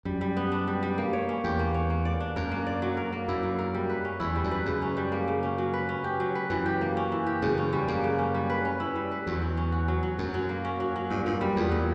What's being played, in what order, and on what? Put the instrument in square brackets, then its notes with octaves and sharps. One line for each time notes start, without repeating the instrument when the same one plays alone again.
[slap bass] F#2 [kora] G3
[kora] G3
B3
D4
G3
G3
A#3
C#5
C#4
[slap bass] E2 [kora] G4
[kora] A#3
C#5
A#3
D5
D4
[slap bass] F#2 [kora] A#4
[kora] A#3
D5
F#3
A#4
A#3
[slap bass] F#2 [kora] E4
[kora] F#3
A#4
G3
B4
C#4
[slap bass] E2 [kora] E4
[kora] G3
[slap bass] F#2
[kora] B4
[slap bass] F#2 [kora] C#3
[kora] C#4
G3
A#3
C#3
C#4
F#3
B4
C#4
G4
F#3
B4
[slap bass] F#2 [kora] E3
[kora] G4
A#3
C#4
E3
G4
[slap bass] F#2 [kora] C#3
[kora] C#4
G3
[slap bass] F#2 [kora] A#3
[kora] C#3
C#4
G3
B4
C#4
E4
G3
B4
[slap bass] E2 [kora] F#3
[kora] F#3
C#4
F#4
F#3
F#3
[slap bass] F#2 [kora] F#3
[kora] F#3
A#3
C#4
F#3
F#3
[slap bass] G2 [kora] A#2
[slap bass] G2 [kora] A#2
[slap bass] F#2 [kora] G3
[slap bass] E2 [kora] B3
[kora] A#2